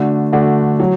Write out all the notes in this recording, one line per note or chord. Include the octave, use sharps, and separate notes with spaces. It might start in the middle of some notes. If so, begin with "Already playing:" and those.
Already playing: D3 A3 D4 F#4
D3 A3 D4 F#4
F#3